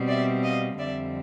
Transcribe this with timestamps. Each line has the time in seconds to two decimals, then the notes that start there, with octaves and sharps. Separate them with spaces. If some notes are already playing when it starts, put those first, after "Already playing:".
Already playing: B2 G3 C4
0.08 D5 E5
0.43 D#5 F5
0.78 F2 D3 G3 C4 D5 E5